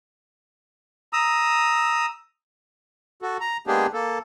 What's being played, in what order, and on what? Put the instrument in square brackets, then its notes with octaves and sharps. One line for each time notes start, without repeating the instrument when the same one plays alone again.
[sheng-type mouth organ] A#5 D#6 E6
[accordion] F#4 A4
A#5
G#3 A#3 B3 D4 G4 G#4
A#3 A4